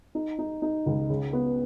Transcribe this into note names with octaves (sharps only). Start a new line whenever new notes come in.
D#4
D#4
D#4
C#2
C#3
B3